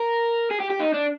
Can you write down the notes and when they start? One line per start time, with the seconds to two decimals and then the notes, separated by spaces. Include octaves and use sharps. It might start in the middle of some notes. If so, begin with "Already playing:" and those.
Already playing: A#4
0.51 G#4
0.60 G4
0.70 G4
0.80 D#4
0.94 D4